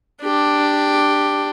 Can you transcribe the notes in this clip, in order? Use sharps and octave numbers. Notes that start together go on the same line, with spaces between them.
D4 G4